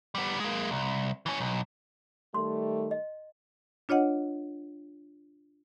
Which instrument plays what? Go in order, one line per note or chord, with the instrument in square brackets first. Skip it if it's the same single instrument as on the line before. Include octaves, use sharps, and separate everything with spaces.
[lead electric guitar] G3 B3
G#3 A#3
C2
E3 C#4
B1
[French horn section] D#3 G3 A3 [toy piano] C6
[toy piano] D#5
[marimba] D4 F4 C#5 D#5 F#5